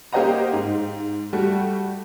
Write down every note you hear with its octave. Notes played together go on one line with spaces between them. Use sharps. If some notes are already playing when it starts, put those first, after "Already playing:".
A#3 G4 C5 D#5 F#5 A#5
G#2
G3 A3 F#4